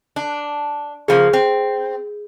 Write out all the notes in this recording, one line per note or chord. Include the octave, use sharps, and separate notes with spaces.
D4
C#3 F3 A#3 G#4
C4